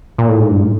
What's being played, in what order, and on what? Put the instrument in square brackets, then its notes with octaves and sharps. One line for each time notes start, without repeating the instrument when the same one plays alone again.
[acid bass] A#2
A2
G#2
G2
A2